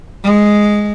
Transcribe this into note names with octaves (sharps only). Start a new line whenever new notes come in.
G#3